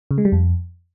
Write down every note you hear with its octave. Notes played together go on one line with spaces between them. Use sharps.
C#3
G#3
G3
F2